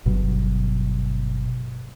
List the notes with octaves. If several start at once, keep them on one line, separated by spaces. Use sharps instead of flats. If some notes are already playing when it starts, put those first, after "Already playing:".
G1 B2 F#3